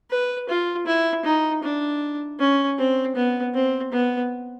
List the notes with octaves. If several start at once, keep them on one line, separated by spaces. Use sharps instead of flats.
B4
F4
E4
D#4
D4
C#4
C4
B3
C4
B3